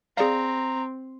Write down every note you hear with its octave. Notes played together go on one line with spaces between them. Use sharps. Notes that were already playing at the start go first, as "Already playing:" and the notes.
C4 G#4 D5 F5 A#5